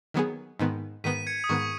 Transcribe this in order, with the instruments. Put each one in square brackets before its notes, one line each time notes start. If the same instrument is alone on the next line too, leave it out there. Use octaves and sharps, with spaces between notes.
[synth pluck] D#3 F#3 B3 G#4
G#2 D#3 B3
[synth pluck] G#2 D#3 B3 [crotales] B6 D#7
[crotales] G#6 C#7
D#6
[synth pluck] G#2 D#3 B3 [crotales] C#6